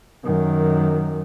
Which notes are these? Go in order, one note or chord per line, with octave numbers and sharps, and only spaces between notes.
F#2 D#3